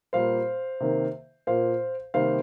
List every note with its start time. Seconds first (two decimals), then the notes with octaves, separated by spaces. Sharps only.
0.13 A#2 G3 A#3 C5 F5
0.80 C3 D#3 A#3
1.47 A#2 A#3 C5 F5
2.14 C3 D#3 G3 A#3 C5 F5